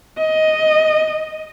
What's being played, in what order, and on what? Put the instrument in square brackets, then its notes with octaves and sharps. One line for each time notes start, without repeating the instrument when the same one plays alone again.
[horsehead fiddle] D#5